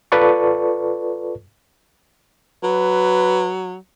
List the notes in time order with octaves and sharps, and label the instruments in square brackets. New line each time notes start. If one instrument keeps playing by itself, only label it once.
[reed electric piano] F4 A4 B4 D5 A5 C#6
[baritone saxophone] F#3 [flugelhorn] B4